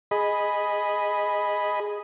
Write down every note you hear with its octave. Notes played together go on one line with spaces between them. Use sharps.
G#4 D#5 B5